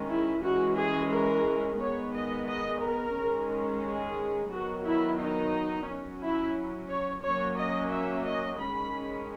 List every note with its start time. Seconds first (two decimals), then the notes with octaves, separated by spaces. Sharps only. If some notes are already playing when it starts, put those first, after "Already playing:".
Already playing: D#3 G#3 C#4
0.09 E4
0.43 E3 G#3 C#4 F#4
0.77 G#4
1.10 A#4
1.78 D#3 G#3 B3 C#5
2.13 D#5
2.47 D#5
2.81 A#4
3.15 D#3 G#3 C#4
3.83 G#4
4.51 D#3 F#3 B3 F#4
4.85 E4
5.19 D#4
5.88 F#3 C#4
6.22 E4
6.90 C#5
7.23 F#3 A#3 C#4 C#5
7.58 D#5
7.92 E5
8.26 D#5
8.60 D#3 G#3 C#4 B5